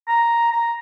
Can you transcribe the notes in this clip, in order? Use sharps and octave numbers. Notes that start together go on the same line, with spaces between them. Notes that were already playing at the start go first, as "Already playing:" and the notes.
A#5
A#5